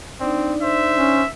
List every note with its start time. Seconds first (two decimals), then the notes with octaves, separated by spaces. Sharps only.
0.20 C4 D4 D#4 D5
0.63 C5 E5
0.96 C#4